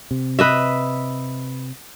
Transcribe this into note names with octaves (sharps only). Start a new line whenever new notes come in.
C3
B4 D#5 E5